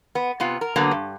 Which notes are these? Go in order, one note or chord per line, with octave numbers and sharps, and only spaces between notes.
B3
C3 B3 F4 F#5
A#4
D3 F#3 A#3 B3
G2